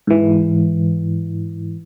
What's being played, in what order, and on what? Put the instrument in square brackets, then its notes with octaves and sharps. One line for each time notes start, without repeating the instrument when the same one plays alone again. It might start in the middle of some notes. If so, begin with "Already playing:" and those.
[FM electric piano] G#2 E3